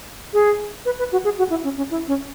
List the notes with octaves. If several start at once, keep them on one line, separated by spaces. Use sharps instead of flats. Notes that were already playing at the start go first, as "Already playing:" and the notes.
G#4
B4
B4
F#4
G#4
F#4
E4
C#4
C#4
E4
C#4